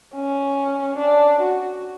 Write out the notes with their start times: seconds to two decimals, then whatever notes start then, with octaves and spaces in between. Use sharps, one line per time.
0.14 C#4
0.98 D4
1.40 F#4